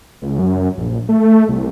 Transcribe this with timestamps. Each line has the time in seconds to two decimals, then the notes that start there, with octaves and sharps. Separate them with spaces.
0.22 C#2
0.39 F#2
0.77 A#1
1.09 A3
1.49 C2